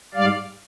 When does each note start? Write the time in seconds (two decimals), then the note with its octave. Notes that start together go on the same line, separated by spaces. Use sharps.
0.14 G#2 G3 D5 F5